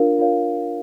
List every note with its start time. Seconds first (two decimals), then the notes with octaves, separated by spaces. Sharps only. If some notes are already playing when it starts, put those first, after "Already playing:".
Already playing: D4 F4 A#4 C#5 F5
0.18 D4 F4 A#4 C#5 F5